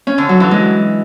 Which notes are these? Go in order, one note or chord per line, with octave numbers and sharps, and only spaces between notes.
C#4
D3
F#3
E3
G#3